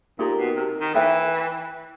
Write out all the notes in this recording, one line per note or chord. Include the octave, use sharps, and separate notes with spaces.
A#2 D#4 G4 A#4
B2
C3
D#3
E3 B4 E5 G5